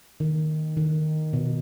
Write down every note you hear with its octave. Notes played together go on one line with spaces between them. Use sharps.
D#3
D#3
B2